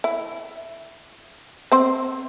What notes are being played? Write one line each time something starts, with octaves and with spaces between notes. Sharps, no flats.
E4
C4 C5